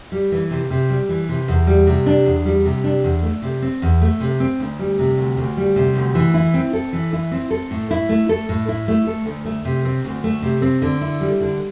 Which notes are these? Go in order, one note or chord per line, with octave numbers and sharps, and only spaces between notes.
G3
E3
C3
C3
G3
E3
C3
E2
G3
C3
D4
E2
G3
C3
D4
E2
A3
C3
C4
E2
A3
C3
C4
D2
G3
C3
D2
D2
G3
C3
D2
E3
E4
C4
A4
E3
E4
C4
A4
A2
E4
A3
A4
A2
E4
A3
A4
D2
A3
C3
C4
D2
A3
C3
C4
D3
E4
G3
D3